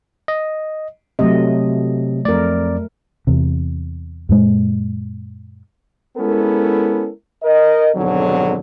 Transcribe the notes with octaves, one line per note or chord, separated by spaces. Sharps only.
D#5
C3 F#3 A3 D#5
F2 A3 A#4 D5
E2 C3
F#2 A#2 G#3
G#3 B3 C#4 E4 A4 A#4
A#4 D#5
G#1 F2 G#2 B2 D3 F#3